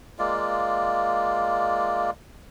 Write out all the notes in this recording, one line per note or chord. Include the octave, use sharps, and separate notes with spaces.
G#3 A#3 F4 D5